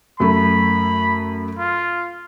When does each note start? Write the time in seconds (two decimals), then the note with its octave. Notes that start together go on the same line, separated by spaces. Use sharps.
0.20 F#2 A3 B5
1.58 F4